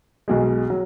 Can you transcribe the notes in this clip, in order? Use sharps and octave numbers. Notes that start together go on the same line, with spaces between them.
B1 B2 G#3
F#3